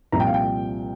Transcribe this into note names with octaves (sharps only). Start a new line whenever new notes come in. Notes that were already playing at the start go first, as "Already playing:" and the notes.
C2 A#2 F3 A#5
G5
F5
G5